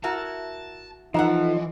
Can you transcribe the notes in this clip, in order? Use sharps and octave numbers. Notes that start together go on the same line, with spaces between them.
E4 F#4 A#4 A5
E3 F3 D#4 A4 B4 F#5